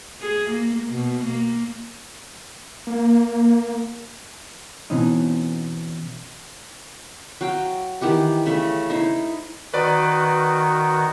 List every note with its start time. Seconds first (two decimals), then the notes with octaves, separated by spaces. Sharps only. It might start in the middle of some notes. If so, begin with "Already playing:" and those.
0.22 G#4
0.50 A#3
0.88 B2
1.25 A#3
2.87 A#3
4.90 B2 E3 C4 C#4 D#4
7.41 F#3 F5 G5
8.01 D#3 E3 G4 F#5
8.46 C#3 A3 E5
8.90 D#4 E4 C5
9.74 D#3 F#4 B4 D5